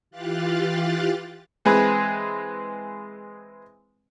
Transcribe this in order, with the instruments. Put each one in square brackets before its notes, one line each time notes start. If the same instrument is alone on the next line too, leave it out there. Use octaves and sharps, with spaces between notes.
[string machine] E3 F4 G4 F5 F#6 A6
[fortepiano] E3 G#3 C4 G#4 B4